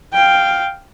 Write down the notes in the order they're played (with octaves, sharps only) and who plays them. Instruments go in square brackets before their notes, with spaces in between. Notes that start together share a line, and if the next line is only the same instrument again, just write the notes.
[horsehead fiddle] F5 G5